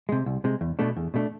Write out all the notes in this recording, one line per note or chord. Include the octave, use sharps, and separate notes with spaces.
C3 G#3
C2
C3 G#3
E2
B2 A3 D4
E2
B2 A3 D4